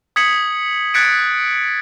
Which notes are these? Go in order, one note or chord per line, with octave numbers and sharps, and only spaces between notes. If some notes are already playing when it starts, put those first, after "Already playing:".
D#6 G#6 B6 C#7 F#7
F#6 G#6 A6 B6 C#7 D7